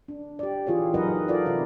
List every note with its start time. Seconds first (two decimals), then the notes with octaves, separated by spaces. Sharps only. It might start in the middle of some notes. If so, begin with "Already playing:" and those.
0.08 D4
0.39 G4 D5
0.67 E3 F4 G#4 C#5
0.94 F#3 D#4 A#4 B4 D#5 F#5
1.28 F4 A4 A#4 C5 D5
1.46 C3 E3 D#4 E4